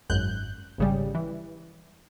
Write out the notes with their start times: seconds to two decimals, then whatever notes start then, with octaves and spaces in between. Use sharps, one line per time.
0.10 G#1 F#2 F#6 G6
0.78 G#1 C#3 G3
1.15 E3